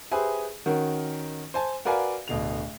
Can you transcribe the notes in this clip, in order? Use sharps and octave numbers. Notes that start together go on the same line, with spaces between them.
G4 G#4 B4 C5 E5 G#5
D#3 C#4 F#4 A#4
C5 G#5 A5
F#4 A#4 B4 D5 F5 G#5
D1 B2 D3 F7